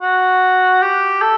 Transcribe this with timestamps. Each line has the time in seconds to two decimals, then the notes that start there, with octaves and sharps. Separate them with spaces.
0.02 F#4
0.82 G4
1.22 A4